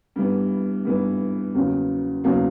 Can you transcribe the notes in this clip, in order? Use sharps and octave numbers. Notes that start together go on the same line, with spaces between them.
G2 E3 G3 B3
G2 E3 G3 B3
E2 C#3 F#3 A#3
E2 C#3 F#3 A#3